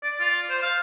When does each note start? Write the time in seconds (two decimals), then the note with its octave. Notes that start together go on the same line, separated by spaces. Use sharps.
0.03 D5
0.20 F4
0.49 C5
0.63 F5